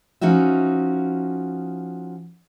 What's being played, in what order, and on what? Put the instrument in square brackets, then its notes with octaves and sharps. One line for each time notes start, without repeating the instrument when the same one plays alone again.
[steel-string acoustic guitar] F3 C#4 D#4 F#4 E5